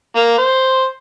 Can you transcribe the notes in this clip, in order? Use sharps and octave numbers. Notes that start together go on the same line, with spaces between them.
A#3
C5